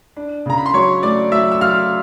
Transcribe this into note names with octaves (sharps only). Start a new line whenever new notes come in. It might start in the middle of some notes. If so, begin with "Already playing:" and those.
D4
C#3 A#5
B5
C6
F#3 C#5 C#6
A3 D5 D6
F#3 E5 E6
E6
F#3 F5 F6